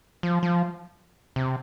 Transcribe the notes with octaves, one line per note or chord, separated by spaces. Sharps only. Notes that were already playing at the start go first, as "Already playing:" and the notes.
F3
F3
C3